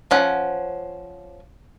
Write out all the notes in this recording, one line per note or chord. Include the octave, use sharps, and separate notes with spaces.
F3 C#4 F#5